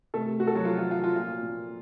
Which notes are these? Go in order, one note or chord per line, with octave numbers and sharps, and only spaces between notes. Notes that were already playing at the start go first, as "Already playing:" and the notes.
C3 A3 A4
C3 F#4
A4
F#3 F#4
F3 F4
F4
F3 F4
F4
A#2 F4
A#2